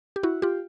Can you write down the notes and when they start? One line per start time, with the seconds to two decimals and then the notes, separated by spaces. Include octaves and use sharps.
0.16 G4
0.23 E4 F#4
0.42 F4 G4